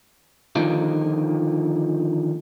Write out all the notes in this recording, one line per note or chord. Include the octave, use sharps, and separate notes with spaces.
D3 D#3 F3 A#3 D#4 F4